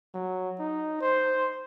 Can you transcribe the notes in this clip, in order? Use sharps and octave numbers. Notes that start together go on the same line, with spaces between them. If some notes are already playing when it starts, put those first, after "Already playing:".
F#3
D#4
C5